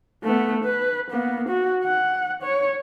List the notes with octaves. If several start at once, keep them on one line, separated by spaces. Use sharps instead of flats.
A3 B3
B4
A#3 B3
F#4
F#5
C#5